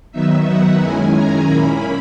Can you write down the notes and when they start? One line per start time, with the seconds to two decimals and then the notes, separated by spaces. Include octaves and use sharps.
0.12 D#3 F#3 B3 D#4 E5
0.46 F#5
0.80 F#2 D#3 G#3 C#4 E4 G#5
1.14 A#5
1.48 A#2 A#3 C#4 E4 B5